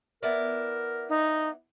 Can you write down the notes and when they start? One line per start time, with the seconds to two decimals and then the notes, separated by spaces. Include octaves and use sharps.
0.23 B3 E4 A#4 D5
1.09 D#4